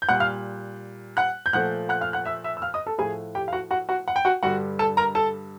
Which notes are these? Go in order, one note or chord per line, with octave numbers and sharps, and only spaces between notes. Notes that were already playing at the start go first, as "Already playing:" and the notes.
G6
A#2 G3 F#5 F#6
F5 F6
F#5 F#6
G6
A#2 F3 A3 F#5 F#6
F#5 F#6
F5 F6
F#5 F#6
E5 E6
E5 E6
E6
F5 F6
D#5 D#6
A4 A5
A2 F3 A3 G#4 G#5
G4 G5
F5
F#4 F#5
F#4 F#5
F#4 F#5
F#5
G5
F#4 F#5
G2 D3 G3 F#4 F#5
A4 A5
A#4 A#5
A4 A5